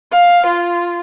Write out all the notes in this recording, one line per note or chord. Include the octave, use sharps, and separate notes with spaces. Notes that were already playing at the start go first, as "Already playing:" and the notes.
F5
F4